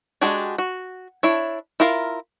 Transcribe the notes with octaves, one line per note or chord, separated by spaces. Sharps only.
G#3 D4 F#4 G4 G#5
F#4
D4 E4 C#5
E4 F4 A#4 F5